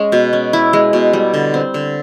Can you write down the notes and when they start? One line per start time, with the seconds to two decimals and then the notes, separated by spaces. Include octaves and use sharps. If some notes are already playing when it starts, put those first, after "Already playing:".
Already playing: G#3 C#4
0.12 B2
0.33 C#4
0.53 E4
0.73 G#3
0.93 B2
1.13 G3
1.34 D3
1.54 C4
1.74 D3